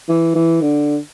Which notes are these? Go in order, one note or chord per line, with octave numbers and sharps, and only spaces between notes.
E3
E3
D3